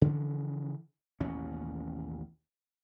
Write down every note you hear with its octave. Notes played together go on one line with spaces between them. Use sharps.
C#3 E3 F3 C#4
A1 D#2 B2 C#4